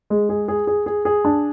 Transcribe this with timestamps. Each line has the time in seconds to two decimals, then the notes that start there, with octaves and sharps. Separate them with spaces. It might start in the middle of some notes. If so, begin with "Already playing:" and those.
0.10 G#3
0.29 G#4
0.48 G#4
0.67 G#4
0.86 G#4
1.05 G#4
1.25 D4